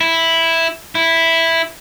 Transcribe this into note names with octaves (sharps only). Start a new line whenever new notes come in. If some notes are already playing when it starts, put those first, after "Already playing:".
E4
E4